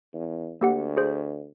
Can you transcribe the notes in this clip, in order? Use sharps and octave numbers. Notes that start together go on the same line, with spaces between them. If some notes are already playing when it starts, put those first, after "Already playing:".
E2
D2 A#3 G4 F#5
G#4 C5